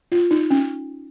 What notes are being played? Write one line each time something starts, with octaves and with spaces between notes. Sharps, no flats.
F4
D#4
C#4